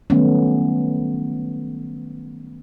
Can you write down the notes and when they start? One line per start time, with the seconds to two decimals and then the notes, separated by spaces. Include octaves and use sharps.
0.10 D#3 F#3 G3 A3 B3 C#4